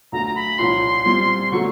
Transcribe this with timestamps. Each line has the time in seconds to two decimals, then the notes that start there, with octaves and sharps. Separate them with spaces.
0.12 D2 D3 F#3 A#3 A#5
0.26 A#5
0.35 B5
0.58 C2 A#2 F3 A#3 C#4 C6
1.04 A#2 G3 C4 E4
1.40 C6
1.51 D3 F#3 A3 C#6